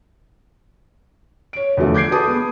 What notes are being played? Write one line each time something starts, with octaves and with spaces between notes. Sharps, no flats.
C#5 D7
E2 D3 F3 A3
D6 G6 G#6 C7 D7
G#4 A4 B4 A5 D6 D#6
B3